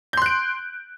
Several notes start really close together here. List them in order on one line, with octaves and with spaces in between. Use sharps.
G6 C6 F#6 D7